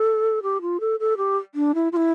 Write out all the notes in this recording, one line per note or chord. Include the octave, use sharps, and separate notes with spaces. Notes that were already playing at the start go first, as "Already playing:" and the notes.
Already playing: A4
G4
F4
A4
A4
G4
D4
E4
F4
E4